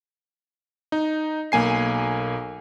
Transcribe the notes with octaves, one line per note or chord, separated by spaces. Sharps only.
D#4
B1 A#3 G#5 C7